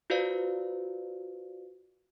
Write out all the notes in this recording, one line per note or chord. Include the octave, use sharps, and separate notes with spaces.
F4 F#4 B4 C5 D5 F5